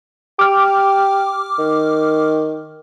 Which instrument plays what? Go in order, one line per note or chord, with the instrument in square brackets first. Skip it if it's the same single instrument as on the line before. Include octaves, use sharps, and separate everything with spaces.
[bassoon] G4 [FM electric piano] D6 F6
[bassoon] D#3